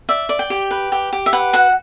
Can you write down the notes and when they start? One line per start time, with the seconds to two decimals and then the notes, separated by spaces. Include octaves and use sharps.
0.09 D5 E5
0.29 D5
0.39 G5
0.50 G4
0.71 B4
0.92 G4
1.13 G4
1.26 E5
1.33 B4 F#5
1.53 F#4 F#5